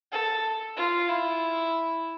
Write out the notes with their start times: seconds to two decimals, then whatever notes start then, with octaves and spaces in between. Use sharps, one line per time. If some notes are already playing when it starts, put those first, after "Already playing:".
0.12 A4
0.77 F4
1.09 E4